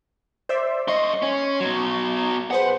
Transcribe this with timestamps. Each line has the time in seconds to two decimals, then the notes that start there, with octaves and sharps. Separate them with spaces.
0.49 C5 D5 E5
0.88 F#2 D#5 C6 C#6
1.22 C#4
1.60 B2 F#3
2.51 G#4 B4 C5 F#5